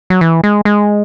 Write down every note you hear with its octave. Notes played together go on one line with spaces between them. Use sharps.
F#3
E3
G#3
G#3